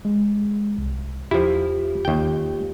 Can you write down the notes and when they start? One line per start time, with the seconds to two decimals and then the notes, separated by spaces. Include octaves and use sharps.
0.05 G#3
0.78 C2
1.31 E2 F3 E4 F4 G4
2.05 D#2 G5